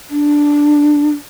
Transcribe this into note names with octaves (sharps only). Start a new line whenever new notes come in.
D4